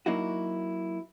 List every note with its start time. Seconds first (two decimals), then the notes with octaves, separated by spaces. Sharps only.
0.06 F#3 A#3 D#4 E4 F#4